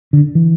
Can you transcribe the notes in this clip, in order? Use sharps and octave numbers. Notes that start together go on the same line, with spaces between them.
D3
E3